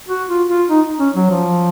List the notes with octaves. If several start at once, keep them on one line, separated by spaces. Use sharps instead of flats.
F#4
F4
F4
D#4
C#4
F#3
F3